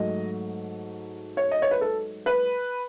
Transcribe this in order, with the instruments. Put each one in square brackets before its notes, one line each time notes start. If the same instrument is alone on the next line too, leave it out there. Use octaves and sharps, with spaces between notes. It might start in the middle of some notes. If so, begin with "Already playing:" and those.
Already playing: [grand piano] G#2 F#3 A3 D#5
C#5
D#5
C#5
B4
A4
B4